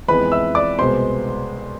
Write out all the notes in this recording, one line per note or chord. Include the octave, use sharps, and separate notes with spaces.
F2 E3 G#3 B3 B4 B5
E5 E6
D5 D6
C2 B2 G#3 B3 C5 C6